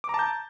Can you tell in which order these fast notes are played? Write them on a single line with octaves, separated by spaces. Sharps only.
D6 A#5 A5 G6